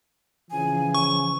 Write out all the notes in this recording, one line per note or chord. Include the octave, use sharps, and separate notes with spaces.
C#3 E3 F3 G#5
C#6